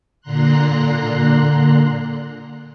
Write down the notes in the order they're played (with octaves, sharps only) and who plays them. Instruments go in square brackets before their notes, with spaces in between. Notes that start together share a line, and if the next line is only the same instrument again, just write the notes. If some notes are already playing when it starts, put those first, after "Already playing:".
[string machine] A#2 D3 A#5 C6 F#6